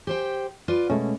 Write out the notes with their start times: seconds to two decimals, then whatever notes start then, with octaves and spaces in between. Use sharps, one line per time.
0.07 G4 C5 G5
0.68 F4 B4 D5
0.90 B2 G#3 A3 C#4